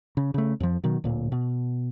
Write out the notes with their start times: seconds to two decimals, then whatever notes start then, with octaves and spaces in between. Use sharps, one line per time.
0.17 C#3
0.34 C#3 A3
0.60 F2 F3
0.84 B2 D#3 F#3
1.04 D1 A#2
1.32 B2